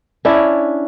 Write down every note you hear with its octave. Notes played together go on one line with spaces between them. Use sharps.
C#4 D4 E4